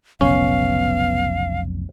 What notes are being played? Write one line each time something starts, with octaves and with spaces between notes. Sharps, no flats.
F1 B1 C#3 B3 C#4 F5